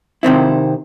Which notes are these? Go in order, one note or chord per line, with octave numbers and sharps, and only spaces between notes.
C3 D#3 C4 E4